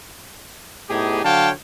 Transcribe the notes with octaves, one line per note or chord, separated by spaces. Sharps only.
A2 B3 D#4 G4 G#4
D3 F#3 C#5 F5 G5 A5